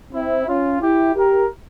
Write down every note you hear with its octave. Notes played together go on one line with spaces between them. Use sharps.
C4 E4
C#4 F4
E4 G4
G4 A#4